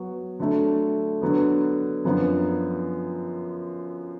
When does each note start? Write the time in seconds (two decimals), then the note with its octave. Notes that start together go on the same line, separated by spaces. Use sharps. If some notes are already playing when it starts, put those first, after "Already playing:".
Already playing: F#3 B3 F#4
0.39 D3 F#3 A3
1.21 D3 F#3 B3
2.05 F#2 D3 F3 B3